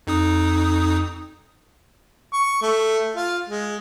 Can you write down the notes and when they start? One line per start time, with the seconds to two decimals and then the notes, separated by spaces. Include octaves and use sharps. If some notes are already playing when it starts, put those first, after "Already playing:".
0.07 F2 D#4 D#6
2.33 C#6
2.62 A3
3.16 F4
3.48 G#3